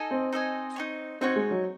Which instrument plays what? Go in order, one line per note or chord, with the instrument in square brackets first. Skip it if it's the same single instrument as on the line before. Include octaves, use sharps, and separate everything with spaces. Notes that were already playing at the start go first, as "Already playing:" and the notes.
Already playing: [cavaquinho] D#4 A4 D#5 G#5
[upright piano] C4
[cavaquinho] D#4 A4 D#5 G#5
D#4 F#4 C#5
[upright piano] C4 [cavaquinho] D#4 F#4 C#5
[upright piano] G#3
F#3